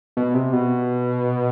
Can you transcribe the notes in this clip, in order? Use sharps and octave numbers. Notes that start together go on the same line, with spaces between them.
B2
C3
B2